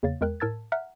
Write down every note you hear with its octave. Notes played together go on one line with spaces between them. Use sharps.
E2 C#3 A#3 C#5 F5 A6
E2 G#3 A#4 G5 F#6
A2 A#4 A5 E6 G#6 A6
E5 F#5 A#5 F6 F#6 B6